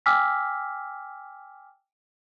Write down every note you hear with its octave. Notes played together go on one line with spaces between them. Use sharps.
G5 G#5 D6 E6 F6 B6